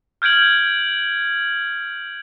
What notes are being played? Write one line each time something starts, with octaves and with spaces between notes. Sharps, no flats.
F6 G6 G#6 D7 F#7